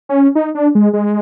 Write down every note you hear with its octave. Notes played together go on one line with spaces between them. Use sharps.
C#4
D#4
D4
G#3
G#3